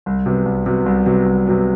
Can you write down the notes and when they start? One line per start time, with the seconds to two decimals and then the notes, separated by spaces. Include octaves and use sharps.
0.06 C2
0.26 C3 F#3 B3
0.46 C2
0.66 C3 F#3 B3
0.86 C2
1.06 C3 F#3 B3
1.26 C2
1.46 C3 F#3 B3